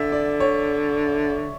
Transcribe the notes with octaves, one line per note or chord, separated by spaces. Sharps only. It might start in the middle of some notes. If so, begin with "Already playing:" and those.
Already playing: D3 E5
D5
C#5